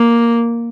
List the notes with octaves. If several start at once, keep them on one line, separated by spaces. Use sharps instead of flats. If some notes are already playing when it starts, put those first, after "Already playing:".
Already playing: A#3